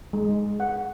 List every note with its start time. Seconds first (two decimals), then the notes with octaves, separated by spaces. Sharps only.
0.13 G#3
0.60 F#5